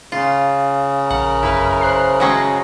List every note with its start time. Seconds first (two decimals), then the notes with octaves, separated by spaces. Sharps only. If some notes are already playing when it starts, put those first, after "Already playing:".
0.12 C#3 F4
1.10 A#1 A#4 F#5
1.43 G1 F#2 E4 B4
1.81 C5 F#6 C7
2.20 F#3 G#3 C#4 C#6 A#6